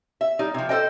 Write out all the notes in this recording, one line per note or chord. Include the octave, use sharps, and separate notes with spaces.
E5
G3 D#4
C3 F3
A4 C5 D#5 G5